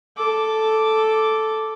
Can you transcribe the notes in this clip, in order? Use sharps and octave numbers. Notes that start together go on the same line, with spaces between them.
A4 D6